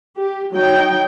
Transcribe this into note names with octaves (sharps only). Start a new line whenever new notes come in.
G4
F#3 D#4 G5